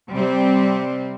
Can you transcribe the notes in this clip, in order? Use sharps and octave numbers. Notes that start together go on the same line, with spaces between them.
C3 G3 C4